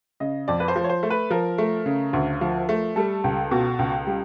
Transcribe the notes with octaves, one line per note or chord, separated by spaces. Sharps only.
C#3 D#5
F2 D5
B4
C5
F3
C#5
C5
A3
B4
F3 A#4
A3
C#3
D2
F3
A3
G3 A4
C#2
B2
C#2
G3